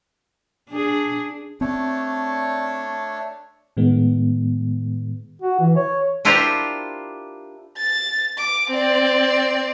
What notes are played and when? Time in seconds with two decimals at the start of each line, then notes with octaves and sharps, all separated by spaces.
0.70 D4 G#4
1.61 A3 C4 D4 C#5
3.77 A2 D#3 G#3 B3
5.42 F#4
5.60 E3
5.76 C#5
6.25 D4 E4 F4 G4 A#4 C5
7.78 A6
8.38 D6
8.70 C4 D5